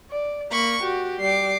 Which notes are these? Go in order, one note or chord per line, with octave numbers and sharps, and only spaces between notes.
D5
A#3 B5 C#6
F#4 G4
G3 D6 C7